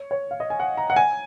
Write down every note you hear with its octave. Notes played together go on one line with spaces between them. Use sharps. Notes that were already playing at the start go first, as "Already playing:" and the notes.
Already playing: C#5
C#5
F5
D#5
G#5
F#5
A#5
F#5
G#5